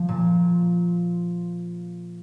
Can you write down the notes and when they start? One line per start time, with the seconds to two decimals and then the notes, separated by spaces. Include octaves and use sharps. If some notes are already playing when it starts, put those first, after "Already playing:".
Already playing: F3
0.09 A#2